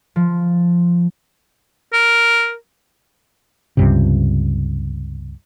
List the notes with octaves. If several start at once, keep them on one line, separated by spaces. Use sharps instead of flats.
F3
A#4
C#2 G2 C3